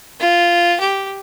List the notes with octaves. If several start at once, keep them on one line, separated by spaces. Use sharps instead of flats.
F4
G4